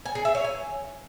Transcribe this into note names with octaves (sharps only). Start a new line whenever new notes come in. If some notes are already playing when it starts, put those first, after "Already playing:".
G#5
G#4
E5
C#5
G#5